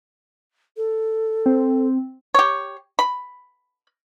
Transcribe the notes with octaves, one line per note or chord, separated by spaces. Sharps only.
A4
C4
G4 C#5
B5